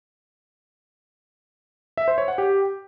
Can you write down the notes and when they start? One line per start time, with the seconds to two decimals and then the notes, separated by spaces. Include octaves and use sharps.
1.97 E5
2.08 C5
2.18 C#5
2.28 F#5
2.38 G4